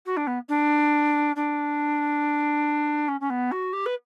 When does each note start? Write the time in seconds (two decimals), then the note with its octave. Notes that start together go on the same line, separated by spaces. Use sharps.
0.06 F#4
0.17 D4
0.27 B3
0.49 D4
1.36 D4
3.08 C#4
3.20 C#4
3.30 B3
3.51 F#4
3.73 G4
3.86 B4